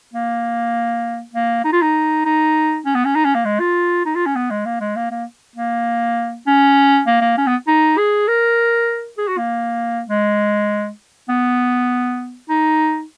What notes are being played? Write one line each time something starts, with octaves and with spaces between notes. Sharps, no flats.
A#3
A#3
D#4
F4
D#4
D#4
C#4
B3
C#4
D#4
C#4
A#3
G#3
F4
D#4
F4
C#4
B3
G#3
A#3
G#3
A#3
A#3
A#3
C#4
A#3
A#3
C#4
B3
D#4
G#4
A#4
G#4
F#4
A#3
G#3
B3
D#4